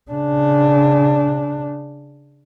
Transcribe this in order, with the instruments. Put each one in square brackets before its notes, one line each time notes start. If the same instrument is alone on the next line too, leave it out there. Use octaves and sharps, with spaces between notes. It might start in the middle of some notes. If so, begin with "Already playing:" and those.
[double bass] C#3 D4